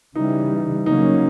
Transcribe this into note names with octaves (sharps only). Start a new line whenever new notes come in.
C#3 E3 G3 D#4
C#3 F#3 A#3 C#4 D#4